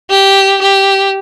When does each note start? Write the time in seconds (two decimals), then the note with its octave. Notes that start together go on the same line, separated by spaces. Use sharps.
0.10 G4
0.62 G4